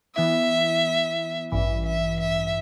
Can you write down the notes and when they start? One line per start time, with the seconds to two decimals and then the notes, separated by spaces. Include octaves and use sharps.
0.16 E3 B3 E4 E5
1.52 A1 G2 E3 E5
1.86 E5
2.20 E5